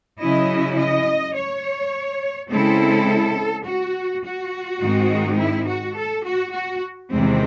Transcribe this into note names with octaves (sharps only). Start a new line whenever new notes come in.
C#3 F#3 C#4 E4 D#5
D#5
C#5
C#3 G#3 C4 E4 A4
F#4
F#4
G#2 D#3 G#3 C4 D#4
E4
F#4
A4
F#4
F#4
E2 C3 D#3 G#3 C4